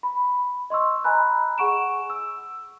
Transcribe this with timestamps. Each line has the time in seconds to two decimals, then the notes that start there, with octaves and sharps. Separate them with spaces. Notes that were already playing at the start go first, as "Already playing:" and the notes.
0.03 B5
0.70 D#5 C6 C#6 E6
1.04 D#5 G#5 A#5 B5 F#6
1.58 G#4 F#5 C#6 D7 E7
2.10 E6